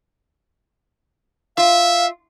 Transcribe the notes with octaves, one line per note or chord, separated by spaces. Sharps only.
F4 E5 F5